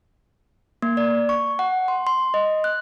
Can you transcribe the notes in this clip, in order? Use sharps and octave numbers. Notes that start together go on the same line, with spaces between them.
A#3
D5
C#6
F#5
C6
C6
D#5
F#6